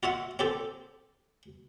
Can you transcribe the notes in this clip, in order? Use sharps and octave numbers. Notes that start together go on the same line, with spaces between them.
F4 F#4 E5 F#5
C4 G4 A4